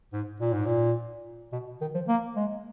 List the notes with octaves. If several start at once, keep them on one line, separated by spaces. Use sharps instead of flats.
G#2
A#2
G#2
A#2
B2
D#3
F3
A#3
G#3